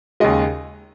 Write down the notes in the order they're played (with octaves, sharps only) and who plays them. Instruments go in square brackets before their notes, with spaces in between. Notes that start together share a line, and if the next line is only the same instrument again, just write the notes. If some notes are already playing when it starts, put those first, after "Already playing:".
[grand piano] D#2 C#3 G#3 D#5